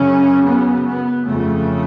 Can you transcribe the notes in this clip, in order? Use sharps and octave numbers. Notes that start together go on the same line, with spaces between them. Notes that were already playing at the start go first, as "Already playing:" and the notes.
Already playing: F#2 C#3 C#4
B3
B3
F2 C#3 A3